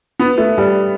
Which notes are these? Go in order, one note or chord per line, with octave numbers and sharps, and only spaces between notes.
B3
A3
G3